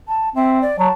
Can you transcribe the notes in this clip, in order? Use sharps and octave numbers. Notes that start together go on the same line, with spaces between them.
A5
C4 E5
D5
F#3 A5